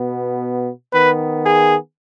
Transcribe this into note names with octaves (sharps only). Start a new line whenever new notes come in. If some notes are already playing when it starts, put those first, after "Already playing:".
Already playing: B2 B3
D#3 B3 B4
G#4